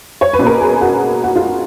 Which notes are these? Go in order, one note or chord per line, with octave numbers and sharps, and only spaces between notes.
C#5
B4
B2 A#3 C#4
A#4
G#4
F#4
F#4
F4